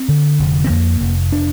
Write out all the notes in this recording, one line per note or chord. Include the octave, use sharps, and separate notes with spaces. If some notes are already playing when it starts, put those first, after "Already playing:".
Already playing: C4
D3
F1
C4
F2 A#3
F1
D4